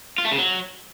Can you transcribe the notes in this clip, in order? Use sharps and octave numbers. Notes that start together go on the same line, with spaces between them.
F4
A3
C#3
F#3